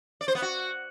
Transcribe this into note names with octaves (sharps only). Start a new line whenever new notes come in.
D5
C5
B3
F#4